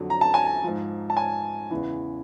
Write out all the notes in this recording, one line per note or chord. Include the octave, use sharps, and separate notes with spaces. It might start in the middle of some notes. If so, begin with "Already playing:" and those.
Already playing: F2 D3 F#3
A#5
A5
G#5
A5
G#2 F3
A5
G#5
E2 C#3 E3